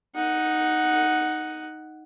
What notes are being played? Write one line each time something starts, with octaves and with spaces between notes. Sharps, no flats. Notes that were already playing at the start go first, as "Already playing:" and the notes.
D#4 F#5